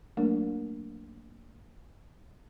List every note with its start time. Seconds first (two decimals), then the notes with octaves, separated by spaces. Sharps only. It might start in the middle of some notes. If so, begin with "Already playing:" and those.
0.17 F#3 A3 A#3 D4 A#4